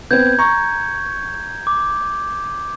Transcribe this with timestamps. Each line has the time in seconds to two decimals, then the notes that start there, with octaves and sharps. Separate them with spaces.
0.11 B3 C4 G6 G#6
0.38 A#5 C#6
1.67 D6